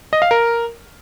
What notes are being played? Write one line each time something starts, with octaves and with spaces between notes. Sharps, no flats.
D#5
F5
A#4